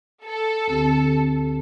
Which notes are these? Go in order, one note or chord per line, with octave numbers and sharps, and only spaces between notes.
A4
D2 D3 C4 G4